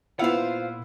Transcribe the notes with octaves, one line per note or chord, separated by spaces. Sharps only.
A#2 B3 E4 F4 C5 F5 F#5